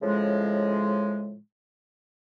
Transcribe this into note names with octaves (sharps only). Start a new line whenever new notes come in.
A2 C#3 F3 G#3